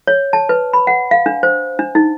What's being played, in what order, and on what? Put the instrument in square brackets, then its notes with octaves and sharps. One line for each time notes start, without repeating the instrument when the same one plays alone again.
[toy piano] C#5
A5
B4
B5
F#5
F5
D4
C5
D4
D#4